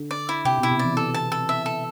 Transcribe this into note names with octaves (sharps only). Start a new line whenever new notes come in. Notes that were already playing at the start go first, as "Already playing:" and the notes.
Already playing: D3
D5
E4
C3 G4
B2 E4
C3
D5
E3
A4
A5
A4
E5
A4